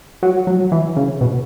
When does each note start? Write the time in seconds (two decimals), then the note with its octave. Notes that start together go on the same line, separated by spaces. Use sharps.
0.23 F#3
0.47 F#3
0.72 E3
0.96 C#3
1.21 B2